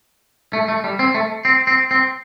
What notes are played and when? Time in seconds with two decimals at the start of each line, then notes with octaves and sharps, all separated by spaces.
0.53 A3
0.68 A3
0.84 G3
0.99 C4
1.14 A3
1.45 C4
1.67 C4
1.91 C4